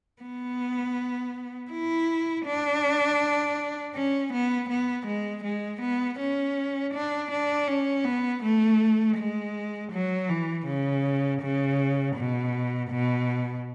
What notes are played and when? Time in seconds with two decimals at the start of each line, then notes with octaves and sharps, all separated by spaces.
0.22 B3
1.71 E4
2.46 D4
3.94 C#4
4.33 B3
4.69 B3
5.06 G#3
5.44 G#3
5.81 B3
6.19 C#4
6.94 D4
7.31 D4
7.68 C#4
8.05 B3
8.43 A3
9.17 G#3
9.92 F#3
10.29 E3
10.66 C#3
11.42 C#3
12.16 B2
12.90 B2